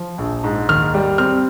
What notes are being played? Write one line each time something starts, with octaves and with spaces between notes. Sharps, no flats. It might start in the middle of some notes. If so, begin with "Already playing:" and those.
Already playing: F3
A#1
G#2
D#2 F6
G3
C4 F6